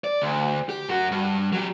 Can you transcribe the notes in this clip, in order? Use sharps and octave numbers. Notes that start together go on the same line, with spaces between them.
D5
D2
G4
F#2 F#4
G2
F#3 G4